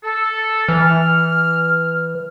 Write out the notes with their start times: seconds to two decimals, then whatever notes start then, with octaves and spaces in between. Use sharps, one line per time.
0.04 A4
0.69 E3 F6